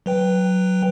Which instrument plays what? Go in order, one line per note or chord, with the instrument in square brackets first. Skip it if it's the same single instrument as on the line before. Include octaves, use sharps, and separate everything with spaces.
[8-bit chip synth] F#3 B4 G5